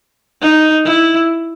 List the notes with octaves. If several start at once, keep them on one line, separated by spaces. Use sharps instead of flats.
D#4
E4